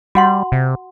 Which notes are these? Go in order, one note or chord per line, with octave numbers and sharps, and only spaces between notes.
G3 F#4 F#5 C6
C3